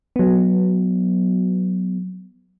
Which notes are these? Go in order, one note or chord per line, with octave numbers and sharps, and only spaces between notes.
F#3 B3